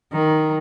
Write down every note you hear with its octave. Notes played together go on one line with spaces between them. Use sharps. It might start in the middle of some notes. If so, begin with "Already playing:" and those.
D#3